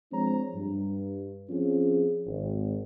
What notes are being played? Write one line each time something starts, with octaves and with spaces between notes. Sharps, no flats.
F3 G#3 C4 D4 C#5 A#5
G2
F3 C4 C#4 F4 G#4
G#1